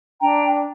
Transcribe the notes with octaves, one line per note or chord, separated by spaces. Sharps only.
D4 G5 A#5